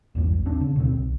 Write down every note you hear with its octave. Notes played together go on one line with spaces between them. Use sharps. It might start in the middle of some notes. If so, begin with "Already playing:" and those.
A#1 E2 G2
G#1
D#1 C4 D4
C#3
D2 B2 C4
B1